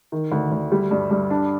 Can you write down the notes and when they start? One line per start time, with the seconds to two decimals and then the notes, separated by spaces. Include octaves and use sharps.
0.12 D#3
0.32 D2
0.52 D2
0.72 G3
0.91 G2
1.11 G2
1.30 D4